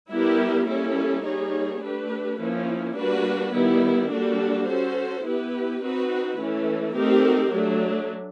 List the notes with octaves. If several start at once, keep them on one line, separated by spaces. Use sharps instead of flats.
G3 B3 E4 G4 A#4
G3 A#3 C#4 E4 A4
G3 A#3 D#4 G#4 C#5
A3 D4 G4 B4
F3 A#3 C#4 E4
G3 A#3 D4 F#4 B4
D#3 G3 B3 E4
G3 A#3 D4 F#4 A4
C#4 F#4 A4 C5
B3 E4 G4 B4
C4 D#4 F#4 B4
E3 A3 C#4
A3 C4 D#4 G4 A#4
F#3 A3 D4